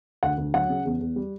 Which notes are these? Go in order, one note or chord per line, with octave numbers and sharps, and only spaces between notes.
D2 F#5
D2
F#3 F#5
C#3
E2
E2
G3